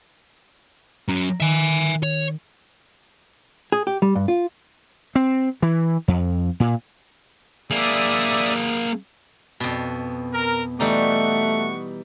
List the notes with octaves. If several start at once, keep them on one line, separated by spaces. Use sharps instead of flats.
F#3 C#4 A#5 D7
D#3 E5 G#5
C#5
G#4
G4
G3
G2
F4
C4
E3
F2
A#2
A#3 G#4 D5 E5 D#6
F2 B2
A#4
E3 G3 A3 D#4 F#4 F#5 C#6